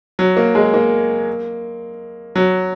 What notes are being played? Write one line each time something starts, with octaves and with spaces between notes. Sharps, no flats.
F#3
A#3
G#3
A#3
F#3